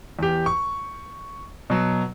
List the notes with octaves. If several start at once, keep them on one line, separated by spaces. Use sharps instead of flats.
E2 G4
C#6
B2 F#3